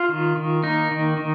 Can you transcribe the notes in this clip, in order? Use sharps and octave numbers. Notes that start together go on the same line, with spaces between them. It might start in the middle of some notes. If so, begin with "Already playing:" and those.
Already playing: F4
D#3
D#3
A#3 D#4
D#3
D#3